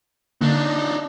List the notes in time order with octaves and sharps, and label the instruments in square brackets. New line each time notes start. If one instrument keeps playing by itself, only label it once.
[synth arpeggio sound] D3 A#3 [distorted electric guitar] D4 D#4